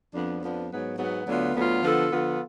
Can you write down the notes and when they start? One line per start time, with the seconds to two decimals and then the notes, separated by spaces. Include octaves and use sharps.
0.13 F2 F3 B3 D4
0.41 F2 F3 B3 D4
0.69 G#2 F#3 B3
0.98 G#2 F#3 B3
1.27 D2 D3 F#3 B3 F4
1.55 D2 D3 F#3 B3 F4
1.83 D3 F3 B3 F4 A4
2.12 D3 F3 B3 F4 A4